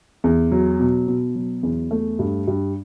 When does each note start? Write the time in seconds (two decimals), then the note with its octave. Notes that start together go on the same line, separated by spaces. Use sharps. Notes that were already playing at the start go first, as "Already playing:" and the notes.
0.24 E2
0.52 F#3
0.80 B2
1.08 B2
1.35 F#3
1.63 E2
1.91 A3
2.19 G2
2.48 G2